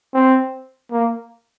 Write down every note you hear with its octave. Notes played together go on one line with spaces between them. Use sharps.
C4
A#3